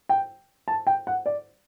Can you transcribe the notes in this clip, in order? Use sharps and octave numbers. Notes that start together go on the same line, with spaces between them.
G5
A5
G5
F#5
D5